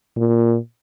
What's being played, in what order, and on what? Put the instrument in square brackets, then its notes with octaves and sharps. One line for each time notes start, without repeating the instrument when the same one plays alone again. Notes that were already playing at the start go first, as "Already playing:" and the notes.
[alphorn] A#2